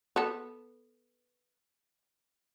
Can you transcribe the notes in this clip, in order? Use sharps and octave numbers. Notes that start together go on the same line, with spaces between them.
B3 A4